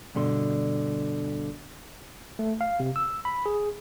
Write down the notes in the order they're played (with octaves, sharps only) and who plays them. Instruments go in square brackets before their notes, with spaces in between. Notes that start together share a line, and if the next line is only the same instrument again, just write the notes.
[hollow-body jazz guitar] G2 B2 D3 C6
[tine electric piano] A3
F5
C3
E6
B5
G#4